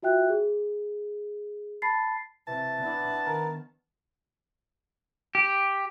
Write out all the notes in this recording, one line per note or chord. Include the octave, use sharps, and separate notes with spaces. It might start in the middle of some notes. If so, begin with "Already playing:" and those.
F4 F#4 E5 G5 F#6
G#4
A5 B5 A6 C7
C3 E3 A5
B3 D4 E4
D#3 A#4
G4